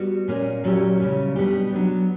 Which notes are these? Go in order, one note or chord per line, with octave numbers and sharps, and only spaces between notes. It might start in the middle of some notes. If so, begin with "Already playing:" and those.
Already playing: G3 B3 F#4
A#2 A#3 C#4
A#2 F#3 C#4 E4 G4
C#3 G3 C#4 E4
B2 G3 B3 D4 G4
F#3 B3 D4